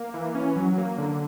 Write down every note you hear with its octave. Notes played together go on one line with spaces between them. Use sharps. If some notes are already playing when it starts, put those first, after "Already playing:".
Already playing: A#3
E3
C#4
F#3
A#3
D3